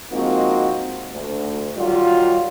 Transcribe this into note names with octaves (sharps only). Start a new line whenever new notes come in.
F3 G#3 A#3 C4 D#4 F#4
D2
D#3 F#3 G3 F4